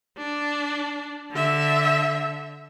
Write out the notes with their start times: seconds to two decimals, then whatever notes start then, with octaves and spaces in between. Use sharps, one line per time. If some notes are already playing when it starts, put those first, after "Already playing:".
0.18 D4
1.32 D3 E5